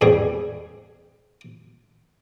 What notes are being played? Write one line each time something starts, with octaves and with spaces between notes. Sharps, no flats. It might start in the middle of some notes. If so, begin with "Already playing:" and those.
E2 G#2 G3 G#4